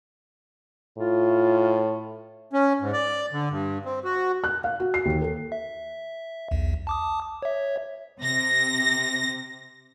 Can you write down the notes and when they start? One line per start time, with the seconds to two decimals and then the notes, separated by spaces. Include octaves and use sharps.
0.98 A2 F4
2.53 C#4
2.81 G#2
2.93 D5
3.33 D3
3.51 G2
3.85 C4
4.04 F#4
4.44 F#6
4.64 F5
4.80 F#4
4.94 C7
5.05 D#2
5.22 A4
5.52 E5
6.51 B1 E2
6.87 A5 D6 D#6
7.42 C#5 E5
8.20 C3 A#6